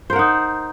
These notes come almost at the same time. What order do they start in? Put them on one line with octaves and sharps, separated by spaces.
C5 A#4 F#5 D#4